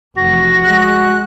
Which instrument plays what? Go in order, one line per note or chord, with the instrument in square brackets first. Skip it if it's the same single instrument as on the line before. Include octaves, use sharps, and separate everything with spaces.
[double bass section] F1 E3 [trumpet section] F#4 [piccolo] A#6
[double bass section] G#3 [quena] F#6